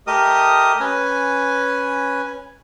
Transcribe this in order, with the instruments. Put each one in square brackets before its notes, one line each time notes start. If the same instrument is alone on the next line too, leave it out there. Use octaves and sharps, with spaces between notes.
[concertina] A3 G4 A#4 D#5 D#6
C#4 B4 G#5